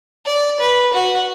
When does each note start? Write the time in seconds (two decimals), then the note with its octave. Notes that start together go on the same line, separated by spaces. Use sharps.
0.26 D5
0.60 B4
0.93 F#4